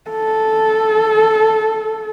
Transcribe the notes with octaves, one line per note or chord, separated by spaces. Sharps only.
A4